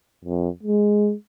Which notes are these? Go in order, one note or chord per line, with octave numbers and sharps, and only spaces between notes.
F2
G#3